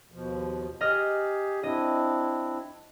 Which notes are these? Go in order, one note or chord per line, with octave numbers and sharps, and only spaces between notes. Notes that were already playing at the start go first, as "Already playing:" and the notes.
D#2 B2 F3
G4 G#4 D#5 F6 A#6
C4 D4 E4 D#5